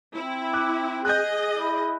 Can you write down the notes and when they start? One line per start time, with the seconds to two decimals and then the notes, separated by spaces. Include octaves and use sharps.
0.15 C4 E4
0.53 D6 F#6
1.05 G#4 D#5 F#6 G6
1.55 E4